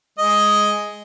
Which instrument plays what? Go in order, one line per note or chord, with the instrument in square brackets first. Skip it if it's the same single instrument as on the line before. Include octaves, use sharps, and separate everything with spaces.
[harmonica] G#3 D#5